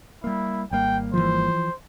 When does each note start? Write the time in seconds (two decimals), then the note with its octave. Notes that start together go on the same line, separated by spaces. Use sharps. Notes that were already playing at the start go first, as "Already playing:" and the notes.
0.24 G3 A#3 E4
0.71 G#1 G3 A#3 G5
1.14 E3 F3 C5